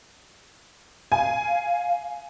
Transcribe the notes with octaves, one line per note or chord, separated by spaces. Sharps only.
F5 G#5